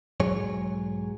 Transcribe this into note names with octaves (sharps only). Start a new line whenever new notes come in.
B1 G#2 F#3 G#4 C#5